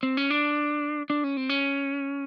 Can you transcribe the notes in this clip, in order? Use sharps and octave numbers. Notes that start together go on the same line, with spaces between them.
C4
C#4
D4
D4
C#4
C4
C#4